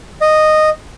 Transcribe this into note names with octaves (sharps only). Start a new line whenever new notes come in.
D#5